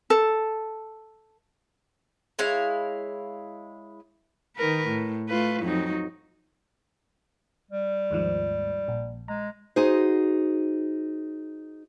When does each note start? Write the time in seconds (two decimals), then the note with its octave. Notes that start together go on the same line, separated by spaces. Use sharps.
0.10 A4
2.39 G#3 E4 C#5 F5
4.57 D#3 A#4 B4
4.87 A2
5.29 A3 F4 B4
5.63 F2 F#3 D#4
7.71 G3
8.11 D#2 G#2 F3
8.88 A#1
9.28 G#3 A#5
9.76 D#4 F#4 G#4 C5